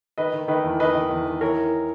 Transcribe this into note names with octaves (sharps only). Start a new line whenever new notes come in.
D#3 B4 D#5
D#3
D#3 B4 D#5
E2
D#3 B4 D#5
D#3
E2
D#3
E3 A#4 C#5
E3